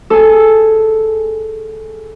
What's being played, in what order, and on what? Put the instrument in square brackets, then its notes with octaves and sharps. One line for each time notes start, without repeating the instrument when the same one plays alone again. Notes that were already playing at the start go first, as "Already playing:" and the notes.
[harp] G#4 A4